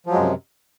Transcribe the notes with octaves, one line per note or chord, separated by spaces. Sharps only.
F#2 C3 F3 F#3 G#3